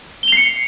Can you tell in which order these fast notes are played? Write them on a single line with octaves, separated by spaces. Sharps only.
G7 F7 C7 C#7